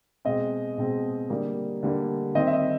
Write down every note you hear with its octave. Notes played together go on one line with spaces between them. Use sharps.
B2 G#3 C4 D#5
B2 G#3 C4
D3 G3 A#3
D3 G3 A#3
D#3 G3 C4 D#5
E5
D#5